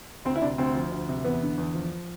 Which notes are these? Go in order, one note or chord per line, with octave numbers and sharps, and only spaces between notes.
D2 C4
E4
C3 D4
D2 C4
F3
D2
C3
E2 B3
D3
E2
F3